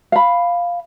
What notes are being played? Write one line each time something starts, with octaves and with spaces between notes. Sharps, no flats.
F5 B5